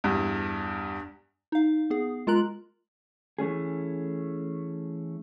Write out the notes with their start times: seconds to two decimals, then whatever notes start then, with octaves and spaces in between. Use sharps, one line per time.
0.04 E2 G2
1.52 D#4 F5
1.90 B3 G#4
2.27 G#3 F4 A#4 A#5 F#6 F#7
3.39 E3 A3 C#4 G#4